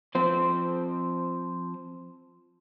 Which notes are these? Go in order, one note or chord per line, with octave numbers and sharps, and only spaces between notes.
F3 C4 C5